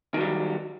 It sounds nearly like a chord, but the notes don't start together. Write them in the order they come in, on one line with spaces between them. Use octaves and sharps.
D#3 F#3 G3